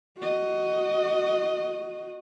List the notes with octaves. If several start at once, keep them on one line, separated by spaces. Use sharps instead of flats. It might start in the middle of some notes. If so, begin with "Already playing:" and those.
F#4 D#5